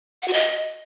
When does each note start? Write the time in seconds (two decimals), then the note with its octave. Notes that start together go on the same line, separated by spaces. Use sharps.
0.22 F#5
0.28 F#4
0.33 D#5